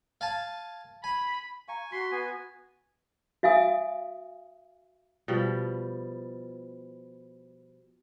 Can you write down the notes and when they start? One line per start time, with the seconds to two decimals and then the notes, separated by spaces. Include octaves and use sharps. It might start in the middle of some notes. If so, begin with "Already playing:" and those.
0.21 F5 G#5 A5
1.04 G#5 B5
1.68 F5 G#5 A#5 C#6
1.92 F#4 C6 B6
2.11 B3 G#5
3.43 F#4 E5 F5 G#5 D#6
5.28 B2 F3 G3